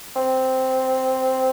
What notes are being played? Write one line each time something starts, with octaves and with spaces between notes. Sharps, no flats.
C4